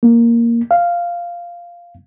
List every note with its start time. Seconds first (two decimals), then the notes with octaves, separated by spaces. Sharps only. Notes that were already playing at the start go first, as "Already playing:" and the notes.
0.03 A#3
0.71 F5